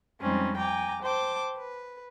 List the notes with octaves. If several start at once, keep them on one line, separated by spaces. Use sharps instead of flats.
F2 G3 G#3 C4 C#4 D#4
G5 G#5 A#5 D6
C5 G5 A5 D6
B4